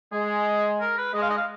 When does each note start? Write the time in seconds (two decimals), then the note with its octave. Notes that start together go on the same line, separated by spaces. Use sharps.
0.12 G#3 G#4
0.80 A#4
0.98 B4
1.14 G#3 D#5
1.22 F5
1.30 D#5
1.38 F5